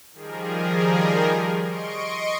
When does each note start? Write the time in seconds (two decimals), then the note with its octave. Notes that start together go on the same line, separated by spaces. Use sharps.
0.12 D#3 F3 G3 G#4 A#4
1.63 D#5 C6 C#6 D7